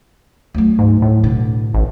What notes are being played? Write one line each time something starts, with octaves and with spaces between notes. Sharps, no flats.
D2 F#3
G#2
A2
B2 D3
A1